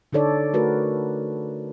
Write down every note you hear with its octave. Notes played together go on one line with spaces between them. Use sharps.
D3 D4 D#4 A4 C#5 D5
A3 F#4 A#4 B4